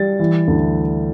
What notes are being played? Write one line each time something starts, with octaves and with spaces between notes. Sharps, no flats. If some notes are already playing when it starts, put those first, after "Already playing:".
Already playing: G3 A6
E3
D2